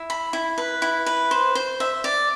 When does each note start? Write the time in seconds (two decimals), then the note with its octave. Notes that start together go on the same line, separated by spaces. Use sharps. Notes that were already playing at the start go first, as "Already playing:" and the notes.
Already playing: E4
0.10 B5
0.33 E4
0.58 B4
0.82 E4
1.06 B4
1.31 C5
1.55 C5
1.80 E5
2.04 D5